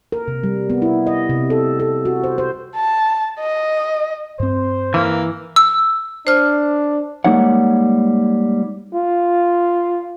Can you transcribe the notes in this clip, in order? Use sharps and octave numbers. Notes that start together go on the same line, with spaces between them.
A#4
C3
G3
B3
E4
D#5
C3
A4
A4
F#4
C5
C5
A5
D#5
G2 C4 C5
E3 A#3
E6
D4 C5 F6
G3 G#3 A#3 D#4 C#5 F#5
F4